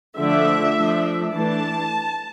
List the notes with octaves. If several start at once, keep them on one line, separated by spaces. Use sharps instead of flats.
D3 F3 A3 D4 E5
F3 A3 D4
E3 A3 D4 A5